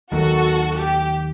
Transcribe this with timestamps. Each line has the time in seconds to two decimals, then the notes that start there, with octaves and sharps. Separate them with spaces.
0.11 D#2 D#3 F#3 A#3 F#4 A4
0.77 G4